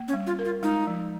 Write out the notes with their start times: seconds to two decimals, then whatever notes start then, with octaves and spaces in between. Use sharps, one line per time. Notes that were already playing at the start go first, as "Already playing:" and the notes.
Already playing: A#3
0.08 C#4
0.13 G3
0.27 F4
0.39 A#4
0.45 F4
0.63 G#3 D#4
0.87 F3